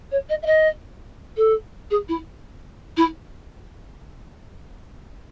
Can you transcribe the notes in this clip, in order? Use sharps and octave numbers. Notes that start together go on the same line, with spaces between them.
C#5
D#5
E5
D#5
A4
G#4
E4
E4